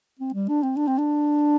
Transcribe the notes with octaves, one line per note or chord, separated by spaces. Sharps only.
C4
G3
D4
C4
D4
C4
D4